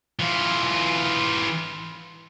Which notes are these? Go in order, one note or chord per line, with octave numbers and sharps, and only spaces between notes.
E3 F4